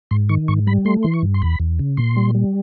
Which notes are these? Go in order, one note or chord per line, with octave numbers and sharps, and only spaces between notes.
G#2 C6
D#3 C#6
G#2 C#6
G3 B5
A3 C6
E3 C6
C#6
G2
C6
E2 B5
E2
C#3
A#2 C6
G3
G3